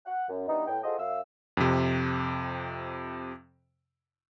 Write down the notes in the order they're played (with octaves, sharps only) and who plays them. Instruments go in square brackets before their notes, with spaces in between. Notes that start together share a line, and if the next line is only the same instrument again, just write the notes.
[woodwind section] F#5
F#2
E3 G3 B3 D4 D#4
A2 B3 G5
F4 F#4 G#4 A4 C5 D#5
F#2 E5 F5 E6
[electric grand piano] F2 C3